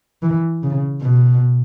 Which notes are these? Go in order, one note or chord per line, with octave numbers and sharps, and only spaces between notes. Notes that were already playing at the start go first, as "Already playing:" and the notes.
E3
C#3
B2